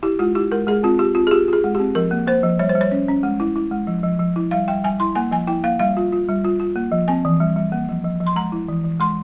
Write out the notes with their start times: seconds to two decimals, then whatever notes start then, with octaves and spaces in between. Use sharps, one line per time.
0.03 E4 G4
0.19 G#3 F4
0.35 E4 G4
0.52 G#3 A#4
0.67 G#3 G#4
0.83 C4 F4
0.99 F4 G4
1.15 C4 F4
1.27 G#4
1.31 F4 G4
1.48 F4 G#4
1.64 G#3
1.75 C4 G4
1.95 F3 A#4
2.11 A#3
2.27 A#3 C5
2.43 F3
2.59 G3 C#5
2.69 C5
2.75 G3
2.81 C#5
2.91 C#4
3.08 C#4
3.23 G#3
3.40 E4
3.56 E4
3.71 G#3
3.87 F3
4.04 F3
4.19 F3
4.36 E4
4.51 G3 F5
4.68 G3 G5
4.84 G3 G#5
5.00 E4 C6
5.15 A#3 G#5
5.31 F3 G#5
5.47 E4 G5
5.64 A#3 F5
5.79 G3 F5
5.97 F4
6.12 F4
6.29 G3
6.44 F4
6.60 F4
6.76 A#3
6.92 F3
7.08 C4 G#5
7.25 E3
7.40 G3
7.56 G3
7.72 A#3
7.89 F3
8.04 F3
8.21 F3
8.27 C6
8.36 G#3 A#5
8.52 E4
8.68 E3
8.84 E3
9.00 G#3 C6